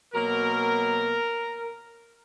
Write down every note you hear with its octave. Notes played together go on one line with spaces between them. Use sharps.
B2 F#3 A#3 A#4